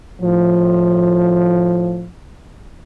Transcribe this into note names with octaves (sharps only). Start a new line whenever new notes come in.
A2 F3